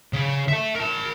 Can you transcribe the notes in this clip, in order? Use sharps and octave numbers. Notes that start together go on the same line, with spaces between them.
C#3
E5 A5
A#4 A5